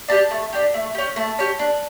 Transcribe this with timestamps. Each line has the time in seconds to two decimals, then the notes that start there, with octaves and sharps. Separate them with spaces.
0.08 D4 G4 A5
0.31 A3
0.53 D4 G4
0.74 A3
0.95 C#4 G4
1.16 A3 A5
1.39 C#4 G4
1.59 D4